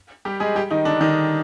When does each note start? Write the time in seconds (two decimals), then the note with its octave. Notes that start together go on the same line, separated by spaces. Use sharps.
0.25 G3 G4
0.40 G#3 G#4
0.55 G3 G4
0.71 D#3 D#4
0.85 D3 D4
1.01 D#3 D#4